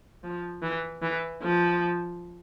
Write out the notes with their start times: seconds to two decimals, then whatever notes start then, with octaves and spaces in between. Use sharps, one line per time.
0.24 F3
0.62 E3
1.02 E3
1.42 F3